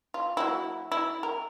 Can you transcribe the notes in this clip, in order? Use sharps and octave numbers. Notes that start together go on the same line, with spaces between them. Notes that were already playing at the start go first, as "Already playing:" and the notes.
F4
F#3 A#3 E4
E4
A#4